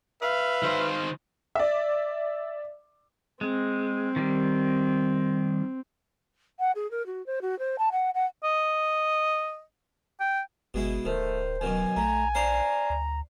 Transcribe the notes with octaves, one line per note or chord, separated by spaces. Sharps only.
B4 E5 F5
D#3 C5
D5 E5
G#3 C4
D#3 G3
F#5
G#4
A#4
F#4
C5
F#4
C5
A5
F#5
F#5
D#5
G5
G1 B2 G#3 E4
D1 D#3 A3 C5
F#2 B2 D#3 G#5
A#1 A3 A#5
D4 C5 F5 A#5
D2